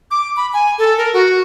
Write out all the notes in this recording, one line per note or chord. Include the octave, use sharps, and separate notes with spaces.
D6
B5
G#5
A4
A#4
F#4